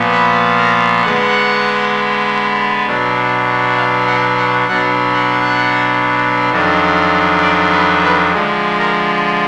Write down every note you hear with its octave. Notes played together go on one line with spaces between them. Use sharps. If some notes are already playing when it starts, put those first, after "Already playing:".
Already playing: A#2 F3 B3
B4
A#4
D3 G#3 B3 F#5
B2 F#3 D4
F5
F#5
F#5
B2 F#3 D4 F#5
F#5
F2 D#3 F#3 D4
D5
B4
B4
D3 F3 G#3
A#4